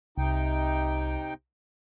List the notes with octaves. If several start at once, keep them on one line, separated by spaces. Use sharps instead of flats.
C2 C3 D#4 G5